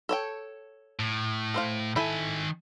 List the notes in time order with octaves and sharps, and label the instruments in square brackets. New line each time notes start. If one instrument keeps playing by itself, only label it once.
[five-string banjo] A4 C#5 G5
[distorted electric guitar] A2
[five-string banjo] A4 C5 F5
[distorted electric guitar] D#3 G#5 [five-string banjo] E4 A4